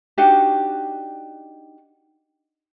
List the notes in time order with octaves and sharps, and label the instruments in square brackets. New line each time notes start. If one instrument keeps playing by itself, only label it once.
[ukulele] D4 D#4 F#4 G4